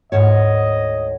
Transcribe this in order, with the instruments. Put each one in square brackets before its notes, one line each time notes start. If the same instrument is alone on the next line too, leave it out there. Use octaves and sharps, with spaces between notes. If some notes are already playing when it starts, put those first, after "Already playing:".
[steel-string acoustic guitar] D2 G#2 C#5 [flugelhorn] D#5